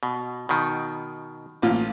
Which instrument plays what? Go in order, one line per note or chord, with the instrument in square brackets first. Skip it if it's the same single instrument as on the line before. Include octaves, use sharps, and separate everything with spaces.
[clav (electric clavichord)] B2
B2 D#3
[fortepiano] A1 A#2 F4